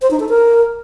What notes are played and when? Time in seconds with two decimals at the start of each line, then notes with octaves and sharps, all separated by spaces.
0.02 C5
0.11 D#4
0.20 A4
0.29 A#4